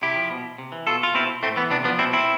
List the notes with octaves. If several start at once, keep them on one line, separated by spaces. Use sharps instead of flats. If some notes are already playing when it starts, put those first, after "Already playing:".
C3 E4 G4
F3
B2
C3
E3
B2 F4 A4
F4
B2 C4 E4
A2 A3 C4
E3 B3
C3 B3 D4
F3 B3 D4
B2 C4 E4
C4 E4